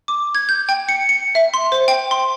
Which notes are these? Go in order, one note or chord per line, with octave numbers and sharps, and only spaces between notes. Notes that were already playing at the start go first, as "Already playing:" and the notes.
D6
G#6
G6
G5
C#7
C#7
E5
C6
C5
G5
C6